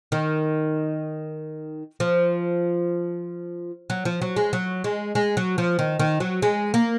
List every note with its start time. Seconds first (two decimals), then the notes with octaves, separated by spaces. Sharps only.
0.12 D#3
2.00 F3
3.90 F#3
4.05 F3
4.22 F#3
4.37 G#3
4.53 F#3
4.84 G#3
5.15 G#3
5.37 F#3
5.58 F3
5.79 D#3
6.00 D#3
6.20 F#3
6.42 G#3
6.74 A#3